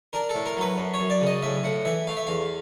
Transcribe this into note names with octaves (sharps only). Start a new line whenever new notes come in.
D4 A#4
A4
A2
A#4
F#3 B4
F#2
C#5
F#2
D5
C#3
D#5
A2 E5
A2 F#5
E3 E5
A3 F5
E5
E2 F5